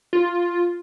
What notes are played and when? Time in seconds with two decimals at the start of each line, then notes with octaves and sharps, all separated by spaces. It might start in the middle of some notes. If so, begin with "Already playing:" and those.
0.13 F4